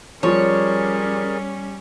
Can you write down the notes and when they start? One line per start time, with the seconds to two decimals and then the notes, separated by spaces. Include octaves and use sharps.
0.23 F3 G3 C#4 G#4 A#4 C#5 D5